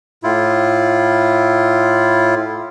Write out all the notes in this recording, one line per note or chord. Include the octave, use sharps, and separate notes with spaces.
A2 E4 F4